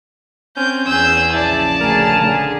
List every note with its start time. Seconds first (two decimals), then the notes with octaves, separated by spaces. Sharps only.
0.57 C4 C#4 G6
0.87 E2 G#4 E6 G6
1.33 A#1 C#3 E4 D5 A5
1.81 D2 G#4 A#4
2.24 D3 G#4